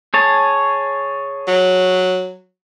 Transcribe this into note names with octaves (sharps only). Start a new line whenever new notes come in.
G#4 C#5 A5
F#3